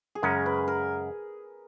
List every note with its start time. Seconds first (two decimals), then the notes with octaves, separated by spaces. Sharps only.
0.15 G#4
0.22 F#2 C#3 G#3 C#4 A#4
0.46 B4
0.68 A#4